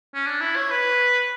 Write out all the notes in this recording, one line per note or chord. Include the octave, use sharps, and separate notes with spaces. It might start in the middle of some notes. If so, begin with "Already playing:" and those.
C#4
D4
E4
C#5
B4